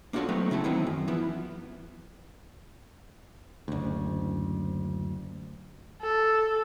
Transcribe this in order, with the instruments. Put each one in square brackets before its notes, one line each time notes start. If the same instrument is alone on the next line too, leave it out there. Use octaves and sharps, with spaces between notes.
[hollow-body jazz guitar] A#3 D4 F4 F#4 A4 C#5
F#3 A3 B3 C4 D#4
C#3 F#3 E4 A4
D#3 E3 F#3 B3 C4 D#4
F#2
E3 F3 B3 E4
[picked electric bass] F#1 D2
[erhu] A4